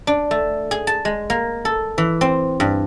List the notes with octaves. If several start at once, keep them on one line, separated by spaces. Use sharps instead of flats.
D4
A3
G#4
A5
G#3
A#3
A4
E3
C4
G2